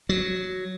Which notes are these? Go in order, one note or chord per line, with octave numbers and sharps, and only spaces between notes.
F#3